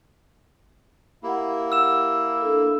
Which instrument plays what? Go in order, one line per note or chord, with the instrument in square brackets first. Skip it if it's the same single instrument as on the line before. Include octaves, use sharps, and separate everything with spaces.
[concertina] A#3 E4 [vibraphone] G4 F#5
[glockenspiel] E6 E7
[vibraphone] D4 A4